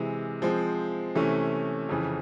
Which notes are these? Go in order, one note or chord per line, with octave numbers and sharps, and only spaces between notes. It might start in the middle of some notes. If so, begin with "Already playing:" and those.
Already playing: C3 E3 G#3
F3 G#3 C4
C3 E3 A3 C#4
F2 C#3 E3